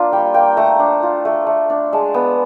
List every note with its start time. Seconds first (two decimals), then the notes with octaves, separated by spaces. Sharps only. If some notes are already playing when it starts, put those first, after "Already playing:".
Already playing: A#3 D4 F4
0.12 G3 G5
0.34 A#3 G5
0.57 A3 A#5
0.79 D4
1.03 F4
1.25 A3
1.47 A3
1.70 D4
1.93 G#3 A5
2.14 B3